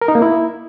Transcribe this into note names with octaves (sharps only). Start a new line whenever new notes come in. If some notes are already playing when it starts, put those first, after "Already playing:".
A#4
D#4
A#3
E4